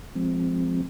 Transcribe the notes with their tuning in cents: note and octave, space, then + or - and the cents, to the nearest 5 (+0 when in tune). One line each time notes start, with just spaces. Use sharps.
F3 +0 G#3 +0 C4 +0